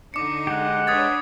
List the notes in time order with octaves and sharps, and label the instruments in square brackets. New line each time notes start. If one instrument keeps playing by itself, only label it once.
[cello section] D3 D#4 [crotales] D6 C#7
[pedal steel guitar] G#3 G4 [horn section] F#5
[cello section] D4 B4 C#5 [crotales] D#6 G#6 A6